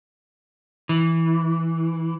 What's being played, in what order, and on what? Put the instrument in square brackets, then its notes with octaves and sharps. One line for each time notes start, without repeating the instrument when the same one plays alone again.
[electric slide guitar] E3